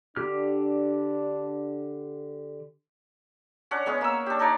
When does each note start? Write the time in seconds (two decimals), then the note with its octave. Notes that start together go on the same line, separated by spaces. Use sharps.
0.16 D3 D4 G4 F6
3.71 C#4 D4 F#5
3.86 G#3 B3 C#4 G#4
4.01 A#3 E6
4.26 D4 G4
4.39 D4 D#4 C#5 D5